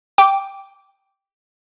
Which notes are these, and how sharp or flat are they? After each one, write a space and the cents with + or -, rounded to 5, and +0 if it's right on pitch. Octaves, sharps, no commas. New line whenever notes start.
G5 +0 D6 -15